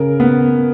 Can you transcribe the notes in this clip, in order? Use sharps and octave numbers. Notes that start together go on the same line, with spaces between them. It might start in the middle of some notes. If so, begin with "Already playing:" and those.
Already playing: C#3 A#4
B3